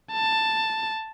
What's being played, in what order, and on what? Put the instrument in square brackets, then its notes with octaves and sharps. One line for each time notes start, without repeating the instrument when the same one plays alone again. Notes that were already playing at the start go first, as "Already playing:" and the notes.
[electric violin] A5